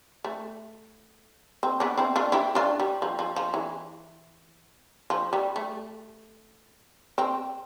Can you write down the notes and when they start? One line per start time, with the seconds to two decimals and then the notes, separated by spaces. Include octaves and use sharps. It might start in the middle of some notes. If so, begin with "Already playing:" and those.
0.24 A3
1.63 C4
1.80 B3 D4
1.98 C4 E4
2.16 D4 F4
2.32 E4 G4
2.55 D4 F4
2.80 G3
3.02 F3
3.19 F3
3.36 F3
3.54 E3
5.10 F3
5.33 G3
5.56 A3
7.18 C4